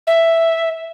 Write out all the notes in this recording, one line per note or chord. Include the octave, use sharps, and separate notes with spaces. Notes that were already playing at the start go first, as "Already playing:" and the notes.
E5